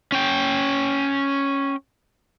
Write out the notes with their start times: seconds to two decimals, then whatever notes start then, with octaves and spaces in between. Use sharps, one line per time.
0.12 C#4 G5